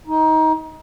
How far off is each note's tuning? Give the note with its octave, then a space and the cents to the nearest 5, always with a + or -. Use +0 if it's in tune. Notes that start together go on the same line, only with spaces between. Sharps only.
D#4 +20